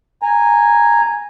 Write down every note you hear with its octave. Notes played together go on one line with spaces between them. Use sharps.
G#5 A#5